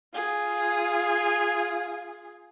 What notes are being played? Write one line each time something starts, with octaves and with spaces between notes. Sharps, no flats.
F4 G#4